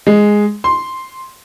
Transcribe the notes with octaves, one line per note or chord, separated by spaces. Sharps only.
G#3
C6